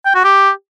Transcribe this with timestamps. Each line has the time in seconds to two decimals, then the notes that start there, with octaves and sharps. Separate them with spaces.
0.05 G5
0.15 F#4
0.24 G4